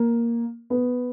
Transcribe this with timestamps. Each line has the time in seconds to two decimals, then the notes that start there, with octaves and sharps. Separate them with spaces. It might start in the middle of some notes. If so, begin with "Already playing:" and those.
Already playing: A#3
0.70 B3